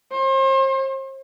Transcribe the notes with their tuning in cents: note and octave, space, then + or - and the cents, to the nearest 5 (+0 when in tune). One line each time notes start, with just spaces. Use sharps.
C5 +40